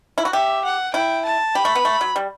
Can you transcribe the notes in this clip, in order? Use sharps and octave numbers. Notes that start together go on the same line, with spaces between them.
E4
F#4
G4 E5
F#5
E4 G5
A5
G4 B5
A3
B3
A3
F#3
G3